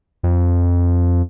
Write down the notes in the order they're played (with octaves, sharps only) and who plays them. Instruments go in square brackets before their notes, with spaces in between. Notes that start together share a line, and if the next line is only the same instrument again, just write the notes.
[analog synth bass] F2